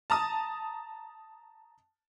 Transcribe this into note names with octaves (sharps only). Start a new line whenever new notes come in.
A5 A#5 D#6